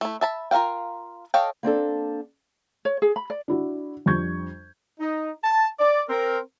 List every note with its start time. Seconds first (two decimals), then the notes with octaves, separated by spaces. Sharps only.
0.01 A3 E4
0.21 E5 A5 B5
0.51 F4 A#4 C5 F5 G5
1.34 A4 C#5 D#5 F5 G5
1.63 A#3 C4 D4 A4
2.85 C#5
3.02 G#4
3.16 B5
3.30 D5
3.48 D4 E4 F#4
4.06 F2 G3 D4 C#6 G6 G#6
5.00 D#4
5.44 A5
5.80 D5
6.09 C4 A#4